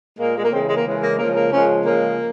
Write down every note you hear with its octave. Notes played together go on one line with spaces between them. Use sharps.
A#2 G#3 A#3
G#3
A#3
C#3 E3 G#3 C4
G#3
A#3
C#3 E3 G#3
A#3
C#3 F3 G#3 A#3
A#3
C#3 F3 G#3 C#4
C#3 F3 G#3 A#3